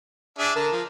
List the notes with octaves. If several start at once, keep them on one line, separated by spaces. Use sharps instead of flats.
D4 G#4 E5
D3 A#4 A5
F3